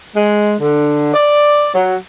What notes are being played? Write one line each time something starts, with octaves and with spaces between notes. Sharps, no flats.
G#3
D3
D5
F#3